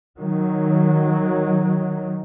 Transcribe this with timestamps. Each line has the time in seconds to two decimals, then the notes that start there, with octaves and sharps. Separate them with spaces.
0.19 D#3 F#3